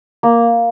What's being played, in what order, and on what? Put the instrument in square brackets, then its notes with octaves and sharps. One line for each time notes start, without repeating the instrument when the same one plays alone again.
[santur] A#3